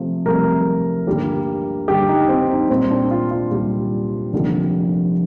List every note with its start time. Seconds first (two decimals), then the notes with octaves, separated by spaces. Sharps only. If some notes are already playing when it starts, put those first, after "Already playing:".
Already playing: C3 F3 A3
0.25 C2 C3 F3 A3 A#4
1.07 G2 D3 G3 A#3
1.88 G2 D3 G3 A#3 G4
2.09 D#4
2.28 C4
2.49 D#4
2.70 C2 A#2 G3 C4
2.91 D4
3.11 F4
3.31 F4
3.51 C2 A#2 G3
4.33 F1 F2 D3 G3 A#3